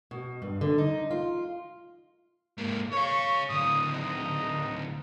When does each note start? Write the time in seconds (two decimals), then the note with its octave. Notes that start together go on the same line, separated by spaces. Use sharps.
0.11 B2
0.42 G2
0.61 D3
0.78 D#4
1.11 F4
2.58 G#2 A#3
2.93 C#5 F5 C#6
3.49 A2 D3 D#6
3.91 D#4